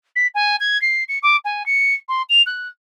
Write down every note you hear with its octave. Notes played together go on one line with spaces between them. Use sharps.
B6
G#5
G#6
C7
C#7
D6
G#5
C#7
C6
F7
F#6